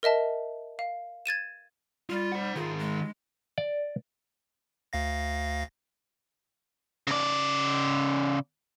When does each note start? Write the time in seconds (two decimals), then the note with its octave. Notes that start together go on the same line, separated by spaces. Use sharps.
0.03 A#4 D#5 E5 A5
0.79 F5
1.26 G#6 A6 D#7 E7
2.10 G3 F4
2.32 C5 F#5
2.55 D#3 F4 G#4
2.79 G#3
3.58 D5
4.93 D2 F5 A#6
7.07 C#3 D5